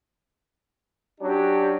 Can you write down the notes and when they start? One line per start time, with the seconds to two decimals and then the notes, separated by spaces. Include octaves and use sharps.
1.20 F#3 C#4 D4 G4